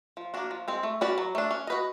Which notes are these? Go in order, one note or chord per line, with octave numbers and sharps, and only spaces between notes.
F3
A#3 D4 F#4
F3
G#3 C4
A3
C#4 F#4 B4 D5
F#3
A3 D4
C#4
F#4 B4 D#5